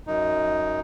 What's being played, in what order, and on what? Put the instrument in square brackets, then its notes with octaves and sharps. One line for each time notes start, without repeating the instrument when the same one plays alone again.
[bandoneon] F#2 D#4